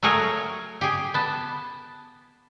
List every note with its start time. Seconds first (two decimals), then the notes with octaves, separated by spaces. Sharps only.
0.03 F#3 A3 G#4 A#4 C#5
0.81 G4 G#4
1.14 B3 A5